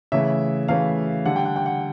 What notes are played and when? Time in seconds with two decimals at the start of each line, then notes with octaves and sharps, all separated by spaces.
0.12 C#3 E3 A3 E5
0.68 C#3 E3 A3 F5
1.25 D3 G3 F#5
1.36 G5
1.45 F#5
1.56 G5
1.66 F#5